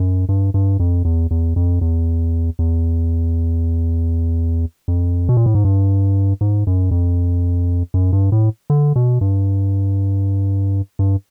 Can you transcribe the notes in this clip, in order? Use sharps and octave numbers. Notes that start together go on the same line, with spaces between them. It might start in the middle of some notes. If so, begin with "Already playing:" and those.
Already playing: F#2
G2
G2
F2
E2
E2
F2
E2
E2
F2
B2
A#2
A2
G#2
G2
G#2
F#2
F2
F#2
G2
A2
D3
B2
G2
G2